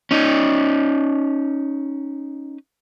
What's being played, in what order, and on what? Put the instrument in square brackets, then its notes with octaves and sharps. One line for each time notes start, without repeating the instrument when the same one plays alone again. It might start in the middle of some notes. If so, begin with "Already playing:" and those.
[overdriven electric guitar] C#4 D#4